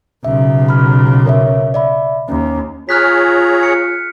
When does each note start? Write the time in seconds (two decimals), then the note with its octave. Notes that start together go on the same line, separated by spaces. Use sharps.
0.24 B1 C#3 E5
0.69 B5 F6
1.26 A#4 C#5 E5
1.74 D5 E5 B5
2.29 D#2 C#4
2.89 F4 G#4 C#5 A#5 F6 F#6 B6
3.63 C#7